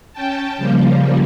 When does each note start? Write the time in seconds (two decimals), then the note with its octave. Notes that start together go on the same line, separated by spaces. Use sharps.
0.13 C#4 G5 A5
0.57 C#3 F3 G3 A#3